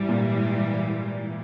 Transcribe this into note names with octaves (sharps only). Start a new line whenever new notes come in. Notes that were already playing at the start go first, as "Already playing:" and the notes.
Already playing: G#2 E3 G3
A#2